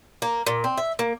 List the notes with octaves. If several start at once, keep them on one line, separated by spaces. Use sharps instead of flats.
A#3
A#2
C4
E5
A#3